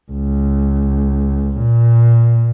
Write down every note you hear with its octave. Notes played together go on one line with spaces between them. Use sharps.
C#2
A#2